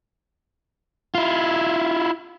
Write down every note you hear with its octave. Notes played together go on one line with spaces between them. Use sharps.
E4 F4